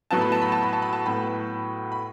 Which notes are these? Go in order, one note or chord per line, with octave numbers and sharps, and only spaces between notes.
A2 F#3 B3 A5
B5
A5
B5
A5
B5
A5
B5
A5
A2 F#3 B3 B5
B5